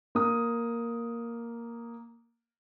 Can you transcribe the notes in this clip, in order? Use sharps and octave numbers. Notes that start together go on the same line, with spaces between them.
A#3 D#6